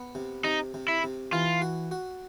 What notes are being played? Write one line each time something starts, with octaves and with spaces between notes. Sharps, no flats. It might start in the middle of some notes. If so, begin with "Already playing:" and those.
Already playing: B3
C3
C3 D#4
C3
E4
C3
E3 F4
F#4
F#4